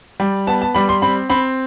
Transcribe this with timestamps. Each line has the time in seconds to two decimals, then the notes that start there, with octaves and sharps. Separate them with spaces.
0.20 G3
0.47 B3 A5
0.62 A5
0.75 G3 B5
0.89 C6
1.02 C4 B5
1.30 C4 B5